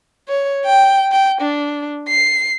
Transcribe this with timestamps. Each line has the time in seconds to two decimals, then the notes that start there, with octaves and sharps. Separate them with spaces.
0.28 C#5
0.65 G5
1.11 G5
1.41 D4
2.08 C7